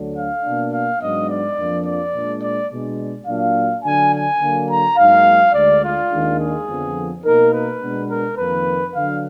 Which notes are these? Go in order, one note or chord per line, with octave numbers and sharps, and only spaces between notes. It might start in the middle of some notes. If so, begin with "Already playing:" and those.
Already playing: D2 D3 F#3 D4
F5
B2 A#3 D4
F5
G#2 F#3 B3 D4 D#5
D5
F2 F3 A#3 D4
D5
A#2 G#3 D4
D5
B2 G#3 D4
A#2 F#3 D4 F5
D3 F#3 D4 G#5
G#5
D3 F#3 A#3 D4
A#5
G#2 F#3 A#3 D#4 F5
D2 D3 G#3 D5
F4
D#2 D#3 G#3 D4
G#4
F2 D3 F3 B3
B2 A#3 D#4 A#4
B4
B2 G#3 B3 D4
A#4
F2 D#3 A#3 B4
D3 F#3 D4 F5